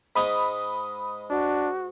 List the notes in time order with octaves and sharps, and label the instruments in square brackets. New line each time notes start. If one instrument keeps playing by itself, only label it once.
[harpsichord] G#2 G#3 [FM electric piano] B5 D#6
[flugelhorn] D4 [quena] F#4